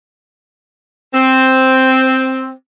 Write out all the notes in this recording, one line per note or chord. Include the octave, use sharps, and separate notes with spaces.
C4